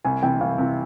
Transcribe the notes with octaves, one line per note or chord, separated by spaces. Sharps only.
C2 G#5
C3 E3 G5
C2 F5
C3 E3